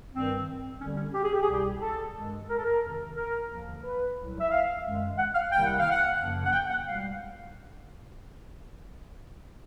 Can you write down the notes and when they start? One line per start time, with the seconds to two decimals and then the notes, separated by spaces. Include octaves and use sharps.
0.13 G2 D#3 G3 C4
0.81 D#2 D3 G3 C#4
0.97 C#4
1.14 G4
1.24 G#4
1.34 G4
1.42 G#4
1.48 C2 B2 G3 G4
1.81 A4
2.15 G2 D#3 G#3
2.49 A#4
2.57 A4
2.64 A#4
2.83 F2 C3 D#3
3.16 A#4
3.50 D#2 D3 F3 A#3
3.84 B4
4.17 C2 A#2 F#3
4.40 E5
4.51 F5
4.84 F#2 D#3 G#3
5.18 F#5
5.35 F5
5.52 C2 C3 D#3 G3 A#3 G5
5.65 F#5
5.79 F5
5.91 F#5
6.19 F#2 C#3 F3 A#3
6.46 F#5
6.52 G5
6.70 F#5
6.86 C#2 B2 G3 F5